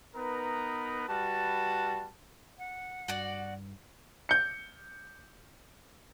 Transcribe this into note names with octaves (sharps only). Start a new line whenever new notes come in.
B3 D#4 A#4 B4 A#5
G3 F#4 B4 A5
F#5
G2 F#4 D5
G6 C#7